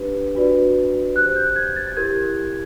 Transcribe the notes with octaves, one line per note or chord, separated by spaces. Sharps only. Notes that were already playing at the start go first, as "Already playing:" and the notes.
Already playing: D4 G4 B4
D4 F#4 B4 D5
G4 C5 F#6
G6
G#6
A6
E4 G4 A#4 G#6